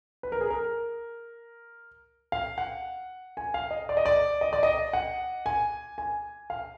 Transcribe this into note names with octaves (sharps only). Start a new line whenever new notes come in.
B4
A#4
G#4
A#4
F5
F#5
G#5
F5
D#5
D5
D#5
D5
D#5
D5
D#5
F#5
G#5
G#5
F5